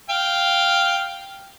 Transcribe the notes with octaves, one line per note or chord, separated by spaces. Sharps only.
F5 G5